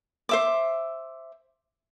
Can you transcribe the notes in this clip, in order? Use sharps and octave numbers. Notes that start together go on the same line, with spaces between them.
C5 E5 D6